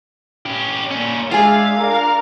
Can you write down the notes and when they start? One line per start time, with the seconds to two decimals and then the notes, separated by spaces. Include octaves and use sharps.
0.46 C#4 G4
0.91 A#2 C#4
1.31 G#3 D4 F4 G#4 E5 F5
1.76 D4 A#4 A#5